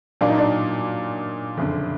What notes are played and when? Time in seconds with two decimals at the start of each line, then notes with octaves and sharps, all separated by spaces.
0.21 A#2 F#3 A#3 D4
0.30 D#4
0.38 D4
1.57 F#1 F2 D3